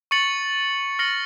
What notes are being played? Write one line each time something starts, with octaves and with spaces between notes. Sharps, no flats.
C#6 A6 C#7 F#7
F6 A#6 C#7 F#7